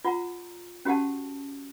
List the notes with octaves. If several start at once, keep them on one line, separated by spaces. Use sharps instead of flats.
F4 F#5 A#5
C#4 F#4 G4 F#5 A5